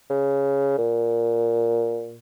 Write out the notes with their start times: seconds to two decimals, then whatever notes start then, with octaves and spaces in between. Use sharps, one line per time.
0.10 C#3
0.78 A#2